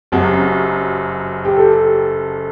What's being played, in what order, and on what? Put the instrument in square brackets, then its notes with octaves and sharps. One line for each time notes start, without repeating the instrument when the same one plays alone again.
[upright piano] F#1 F#2 F#3 [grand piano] G4
[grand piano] G4
A4